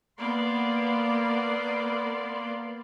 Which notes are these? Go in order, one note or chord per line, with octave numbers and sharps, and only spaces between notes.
A#3 B3 D5 C6